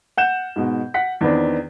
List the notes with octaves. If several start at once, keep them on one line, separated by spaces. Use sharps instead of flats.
F#5 G6 E7
G#2 B2
F#5 B6
E2 D#3 B3 C4 D4